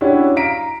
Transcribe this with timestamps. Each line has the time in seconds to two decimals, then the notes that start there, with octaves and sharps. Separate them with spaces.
0.01 C#4 D4 E4 F#4 G4
0.36 F5 A#5 B6 D7